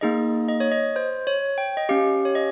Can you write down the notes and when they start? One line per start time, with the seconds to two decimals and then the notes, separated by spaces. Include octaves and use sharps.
0.01 A#3 D#4 G#4 D#5
0.48 D#5
0.60 C#5
0.72 D#5
0.96 C5
1.27 C#5
1.58 G5
1.77 D#5
1.89 C#4 G4 F5
2.25 C#5
2.35 D#5